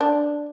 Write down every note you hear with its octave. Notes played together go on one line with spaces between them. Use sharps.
D4